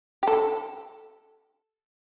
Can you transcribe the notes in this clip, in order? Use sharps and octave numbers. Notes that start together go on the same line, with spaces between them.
G4
A4